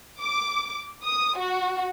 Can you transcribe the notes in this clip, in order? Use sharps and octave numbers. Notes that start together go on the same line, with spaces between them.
D6
D#6
F#4